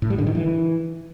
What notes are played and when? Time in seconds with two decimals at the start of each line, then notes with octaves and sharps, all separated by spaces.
0.02 A2
0.10 G3
0.18 D3
0.27 D#3
0.35 E3